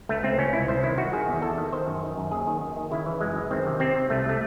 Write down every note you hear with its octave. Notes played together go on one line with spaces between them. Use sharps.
C#2 A3
C#2 C4
C#2 C#4
C2 E4
C2 C5
D#3 E4
D#3 F#4
D#3 G#4
E2
E2 A4
D#3
D#3 C5
F#2
D#3
F#2
D#2 G#4
D#3
D#3
D#3
C#3 E4
E3
F#2 G#3
F#2
D#3 C4
C3
C3 C4
C3
C2 A3
C3 A3